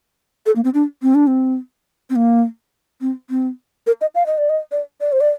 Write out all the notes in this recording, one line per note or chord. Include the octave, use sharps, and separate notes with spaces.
A4
A#3
C4
D4
C4
D4
C4
C4
A#3
C4
C4
A#4
D#5
F5
D#5
D5
D#5
D5
D5
C5
D5